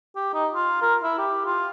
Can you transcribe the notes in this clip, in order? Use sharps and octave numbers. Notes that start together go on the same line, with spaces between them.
G4
D#4
F4
A#4
E4
G4
F4